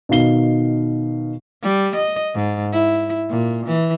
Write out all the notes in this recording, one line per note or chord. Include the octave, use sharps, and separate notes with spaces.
B2 D#3 D#4 F5 C7 G7
G3
D#5
G#2
E4
A#2
E3